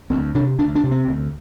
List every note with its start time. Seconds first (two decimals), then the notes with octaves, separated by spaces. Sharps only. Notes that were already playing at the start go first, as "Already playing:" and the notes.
0.10 D2 C4
0.35 C3 D4
0.58 D2 D4
0.75 D4
0.83 C3
0.91 C4
1.08 D2